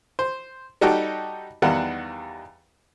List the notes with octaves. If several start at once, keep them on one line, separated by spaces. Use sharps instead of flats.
C5
G3 D#4 F#4 G4 A4
E2 D#3 G3 F5 F#5